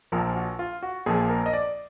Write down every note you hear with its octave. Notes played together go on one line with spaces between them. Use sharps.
A#1 A#2 F3 A#4
F#4
F4
F#4
A#1 A#2 F3 G#4
A#4
D#5
D5